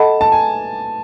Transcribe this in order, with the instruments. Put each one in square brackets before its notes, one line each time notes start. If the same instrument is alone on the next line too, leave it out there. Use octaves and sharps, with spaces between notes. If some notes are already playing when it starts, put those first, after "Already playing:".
Already playing: [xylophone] A4 D#5 F#5 B5 [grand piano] A5
[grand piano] A5
G#5